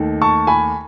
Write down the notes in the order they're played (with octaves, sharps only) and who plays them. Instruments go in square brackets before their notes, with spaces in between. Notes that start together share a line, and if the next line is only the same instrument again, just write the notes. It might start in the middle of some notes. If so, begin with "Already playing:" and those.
Already playing: [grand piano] D#2 D#3 A3
A5 C#6
G#5 B5